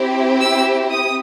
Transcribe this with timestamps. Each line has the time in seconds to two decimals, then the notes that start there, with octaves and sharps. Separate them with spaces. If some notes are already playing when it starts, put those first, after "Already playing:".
Already playing: C4 E4 G4
0.40 E6
0.91 D#6